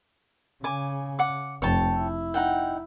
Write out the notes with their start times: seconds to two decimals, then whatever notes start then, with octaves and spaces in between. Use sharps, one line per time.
0.64 C#3 G#5 D6
1.19 F#5 D6
1.62 F1 C#5 G5 A5
1.94 E4
2.34 D#4 F#5 G5